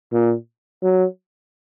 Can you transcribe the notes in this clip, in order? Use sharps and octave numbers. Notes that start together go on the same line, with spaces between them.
A#2
F#3